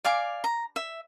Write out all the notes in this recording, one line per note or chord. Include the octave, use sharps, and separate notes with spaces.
D5 F5 G#5 D6
A#5
E5